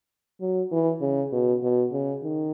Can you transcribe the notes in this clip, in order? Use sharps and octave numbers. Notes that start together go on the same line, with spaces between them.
F#3
E3
C#3
B2
B2
C#3
D#3